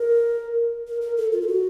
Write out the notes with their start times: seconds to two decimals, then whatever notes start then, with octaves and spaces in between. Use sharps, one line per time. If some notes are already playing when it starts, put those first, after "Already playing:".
Already playing: A#4
0.87 A#4
1.01 A#4
1.17 A4
1.32 F4
1.42 A4
1.48 F#4